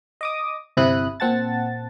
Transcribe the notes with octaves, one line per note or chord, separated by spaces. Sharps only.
D#5 D6 D#6
G1 C3 E4 D#6 F#6
A#2 C4 F#5 A5 A6